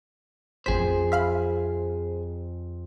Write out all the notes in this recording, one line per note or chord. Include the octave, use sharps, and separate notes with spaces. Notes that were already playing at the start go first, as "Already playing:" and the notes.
A1 F2 C4 G#4 C5 B6
E5 F5 B5